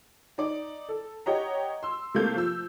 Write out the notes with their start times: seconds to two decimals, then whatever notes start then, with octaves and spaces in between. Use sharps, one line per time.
0.38 D#4 D5
0.89 A4
1.26 G4 C#5 D#5 F#5 A#5
1.83 C6 E6
2.14 C3 A3 A#3 A4 F5 G6
2.36 F3 E6